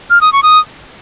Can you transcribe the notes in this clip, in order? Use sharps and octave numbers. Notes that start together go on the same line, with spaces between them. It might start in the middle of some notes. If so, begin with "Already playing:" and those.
F6
D#6
C#6
D#6